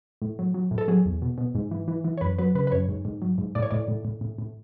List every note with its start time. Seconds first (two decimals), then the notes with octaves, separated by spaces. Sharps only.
0.22 A2
0.39 F#3
0.54 F#3
0.71 A2
0.78 A4
0.88 F#3 G#4
1.06 E2
1.22 B2
1.38 B2
1.55 G#2
1.71 E3
1.88 E3
2.04 E3
2.17 C#5
2.21 F#2 B4
2.39 F#3 B4
2.55 C#3 B4
2.67 B4
2.72 F#2 C#5
2.88 G#2
3.05 G#2
3.22 F#3
3.38 G#2
3.55 A2 D5
3.62 C#5
3.71 A2 D5
3.88 A2
4.05 A2
4.21 A2
4.38 A2